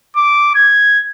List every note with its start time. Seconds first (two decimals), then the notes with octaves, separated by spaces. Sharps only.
0.16 D6
0.55 G#6